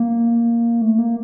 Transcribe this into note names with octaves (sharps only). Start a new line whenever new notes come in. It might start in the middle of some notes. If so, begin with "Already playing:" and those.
Already playing: A#3
A3
A#3